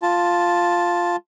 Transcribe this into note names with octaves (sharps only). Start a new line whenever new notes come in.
F4 A5